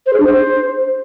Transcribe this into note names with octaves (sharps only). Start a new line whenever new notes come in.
C5
G#4
D4
C5